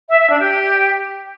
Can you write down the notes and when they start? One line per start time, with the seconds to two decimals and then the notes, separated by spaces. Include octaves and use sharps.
0.08 E5
0.19 E5
0.29 D4
0.39 G4